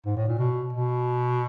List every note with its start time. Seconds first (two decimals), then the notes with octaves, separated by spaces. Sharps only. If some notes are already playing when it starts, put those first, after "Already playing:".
0.06 G#2
0.17 A2
0.28 A#2
0.39 B2
0.73 B2